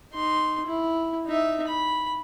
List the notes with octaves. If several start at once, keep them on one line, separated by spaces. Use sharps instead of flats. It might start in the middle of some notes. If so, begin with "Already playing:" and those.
D#4 C6
E4
D#4 E5
B5